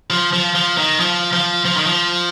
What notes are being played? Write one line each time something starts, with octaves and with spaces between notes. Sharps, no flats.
F3
F3
F3
D#3
F3
F3
F3
D#3
F3